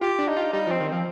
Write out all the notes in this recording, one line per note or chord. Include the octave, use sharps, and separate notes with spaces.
F4 G4
D4
D#4
F4
G3 D#4
F3
C4
D#3
F3 C4